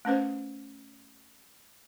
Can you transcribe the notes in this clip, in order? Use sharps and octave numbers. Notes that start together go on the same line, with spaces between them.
A3 C#4 B4 C5